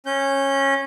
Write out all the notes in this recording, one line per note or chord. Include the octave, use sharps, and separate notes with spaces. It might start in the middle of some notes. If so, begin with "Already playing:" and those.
C#4 G6